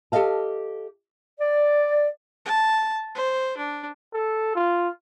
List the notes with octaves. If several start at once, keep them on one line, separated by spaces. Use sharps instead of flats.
G4 A4 B4 D#5 F5 A5
D5
A5
C5
D4
A4
F4